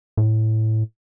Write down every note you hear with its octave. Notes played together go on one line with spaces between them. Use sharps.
A2